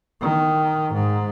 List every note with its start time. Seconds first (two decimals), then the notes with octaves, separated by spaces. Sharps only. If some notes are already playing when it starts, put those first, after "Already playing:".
0.22 D#3
0.94 G#2